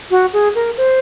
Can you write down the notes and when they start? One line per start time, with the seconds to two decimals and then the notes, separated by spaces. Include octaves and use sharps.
0.11 F#4
0.33 G#4
0.55 A#4
0.77 C5